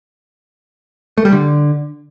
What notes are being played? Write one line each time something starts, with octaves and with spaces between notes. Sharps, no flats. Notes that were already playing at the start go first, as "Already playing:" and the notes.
A3
G3
D3